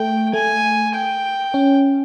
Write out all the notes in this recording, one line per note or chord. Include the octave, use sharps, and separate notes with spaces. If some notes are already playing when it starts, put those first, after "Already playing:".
Already playing: A3 G5
A3 G#5
G5
C#4